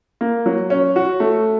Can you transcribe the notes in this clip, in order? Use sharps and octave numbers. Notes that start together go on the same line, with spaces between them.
A#3
F#3
C#4
F#4
A3